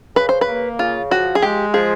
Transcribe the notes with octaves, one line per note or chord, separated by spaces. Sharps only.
C#3 B4
C5
B4
A#3
C#3 F4
F3 F#4
G#4
G#3 G4
F3 G#4